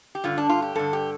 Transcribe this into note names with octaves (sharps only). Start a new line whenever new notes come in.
G4
G2 D3 F4
D4
F4
G4
G2 D3 A4
G4